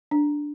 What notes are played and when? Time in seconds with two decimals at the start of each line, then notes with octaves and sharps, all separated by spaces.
0.11 D4